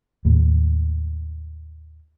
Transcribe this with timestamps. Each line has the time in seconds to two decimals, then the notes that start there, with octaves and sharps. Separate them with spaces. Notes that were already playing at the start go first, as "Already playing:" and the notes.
0.25 D#2 A2 A#3